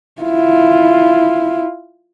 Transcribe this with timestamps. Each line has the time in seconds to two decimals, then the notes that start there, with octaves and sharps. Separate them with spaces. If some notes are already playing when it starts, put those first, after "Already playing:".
0.22 E4 F4